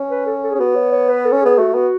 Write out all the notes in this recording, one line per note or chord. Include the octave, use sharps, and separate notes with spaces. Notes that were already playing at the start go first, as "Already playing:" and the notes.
Already playing: C#4
B4
A4
A4
G#4
C#4
B3 F#4
C#5
C#5
B4
A4
C#4
B3 G#4
A3 F#4
B3 F#4